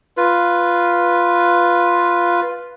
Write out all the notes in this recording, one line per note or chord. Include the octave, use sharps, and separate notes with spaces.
F4 B4